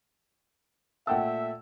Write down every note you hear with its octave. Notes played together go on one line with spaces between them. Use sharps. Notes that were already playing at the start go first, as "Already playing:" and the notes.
A#2 A3 E5 F#5 G5 A5 E6